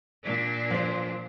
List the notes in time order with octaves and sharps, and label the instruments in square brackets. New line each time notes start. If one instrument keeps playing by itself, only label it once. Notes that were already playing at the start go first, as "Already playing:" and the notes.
[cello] A#2 D4
[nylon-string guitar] F3 C5